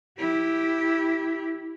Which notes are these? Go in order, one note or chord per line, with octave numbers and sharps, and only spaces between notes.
E4 G4